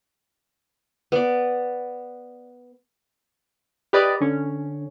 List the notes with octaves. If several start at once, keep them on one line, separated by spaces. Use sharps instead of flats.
B3 D5
G4 B4 D5 D#5
D3 C#4